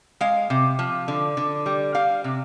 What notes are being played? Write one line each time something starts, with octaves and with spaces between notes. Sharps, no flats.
G#3 F5
C3
F3
D3
D3
G3
G3 F5
C3